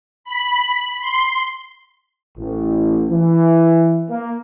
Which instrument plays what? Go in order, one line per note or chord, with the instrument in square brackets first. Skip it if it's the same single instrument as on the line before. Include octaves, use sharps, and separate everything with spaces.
[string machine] B5
C6
[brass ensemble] A1
E3
A#3